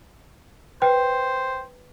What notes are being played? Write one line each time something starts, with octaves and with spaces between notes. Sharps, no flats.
B4 C5 G5